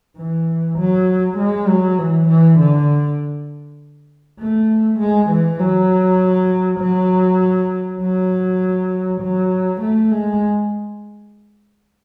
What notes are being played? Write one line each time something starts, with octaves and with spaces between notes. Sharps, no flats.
E3
F#3
G#3
F#3
E3
E3
D3
A3
G#3
E3
F#3
F#3
F#3
F#3
A3
G#3